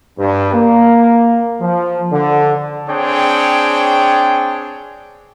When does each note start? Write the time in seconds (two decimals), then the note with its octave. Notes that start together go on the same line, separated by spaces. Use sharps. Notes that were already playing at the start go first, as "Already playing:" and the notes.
0.18 G2
0.54 A#3
1.61 F3
2.12 D3
2.89 C4 D4 G#4 C#5 G5